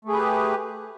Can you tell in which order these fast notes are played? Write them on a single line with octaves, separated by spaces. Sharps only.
A3 G#4 B4 G4